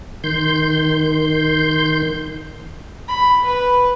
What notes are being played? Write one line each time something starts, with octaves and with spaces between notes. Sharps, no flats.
D#3 C6 G6
B5
B4